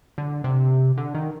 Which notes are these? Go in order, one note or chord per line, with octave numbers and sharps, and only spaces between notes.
D3
C3
D3
D#3